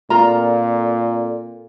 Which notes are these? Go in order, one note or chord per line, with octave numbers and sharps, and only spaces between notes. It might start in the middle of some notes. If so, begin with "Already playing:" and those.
A#2 C4 F4 A4 D5 A#5